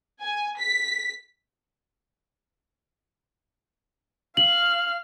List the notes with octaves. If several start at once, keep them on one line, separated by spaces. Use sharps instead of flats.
G#5
B6
F5 F6 F#7